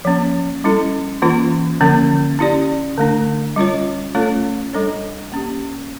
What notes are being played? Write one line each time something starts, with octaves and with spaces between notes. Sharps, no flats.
F3 A#3 C#4
G3 C#4 E4 A4
E3 A#3 C#4 F4
D3 F3 A#3 C#4
C#4 E4 G4 D5
D3 A3 D4
G3 C#4 F4 C#5
A3 C#4 F4 A4 C#5
G3 D4 A4 C#5
A#3 C#4 G4